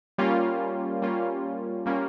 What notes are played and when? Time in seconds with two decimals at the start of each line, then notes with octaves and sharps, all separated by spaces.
0.18 G3 A#3 C#4 F4
1.02 G3 A#3 C#4 F4
1.86 G3 A#3 C#4 F4